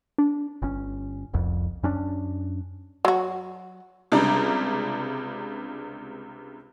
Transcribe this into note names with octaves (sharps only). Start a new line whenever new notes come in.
D4
G1 C#4
F1 C2 F2
F#2 C#4 D4
F#3 F#4
C#2 C3 G3 D4 A#5